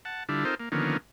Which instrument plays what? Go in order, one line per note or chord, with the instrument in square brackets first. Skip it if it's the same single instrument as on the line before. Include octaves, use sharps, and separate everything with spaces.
[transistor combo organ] F#5 A5
D3 G3 D4 E4 F4
C4 D#4 F4 A4 A#4 C5
A#3
D3 D#3 F3 A#3 B3 C#4